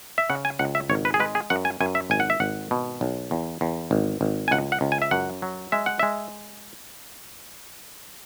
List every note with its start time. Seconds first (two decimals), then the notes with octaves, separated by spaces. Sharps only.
0.18 E5
0.30 C#3 F#5
0.45 G#5
0.59 C#2 F#5
0.75 E5
0.90 G#1 C#5
1.05 B4
1.14 G#4
1.20 G#3 B4
1.35 G#4
1.50 F#2 F#5
1.65 G#5
1.81 F#2 G#5
1.95 E5
2.10 G#1 G#5
2.20 F#5
2.30 E5
2.40 G#1 F#5
2.71 B2
3.01 B1
3.31 E2
3.61 E2
3.91 G#1
4.21 G#1
4.48 G#5
4.51 C#2 F#5
4.72 F#5
4.81 C#2
4.92 G#5
5.02 E5
5.11 F#2 F#5
5.42 F#3
5.72 G#3 E5
5.86 F#5
5.99 G#3 E5